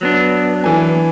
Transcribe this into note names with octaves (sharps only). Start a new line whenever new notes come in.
F#3 B3 D4
E3 G#5